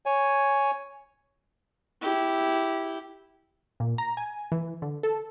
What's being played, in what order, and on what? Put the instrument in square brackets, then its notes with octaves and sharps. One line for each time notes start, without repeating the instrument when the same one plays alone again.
[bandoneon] C#5 G#5
[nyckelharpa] E4 G4
[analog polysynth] A#2
A#5
G#5
E3
D3
A4